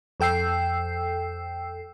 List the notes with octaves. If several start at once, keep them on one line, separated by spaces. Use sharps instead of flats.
F2 A4 G5 E6 C7